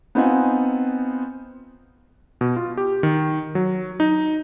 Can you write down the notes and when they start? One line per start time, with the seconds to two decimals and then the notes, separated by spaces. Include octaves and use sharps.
0.15 B3 C4 D#4 F4 F#5 G#5
2.41 B2
2.57 F4
2.77 G4
3.03 D#3
3.55 F#3
4.00 D#4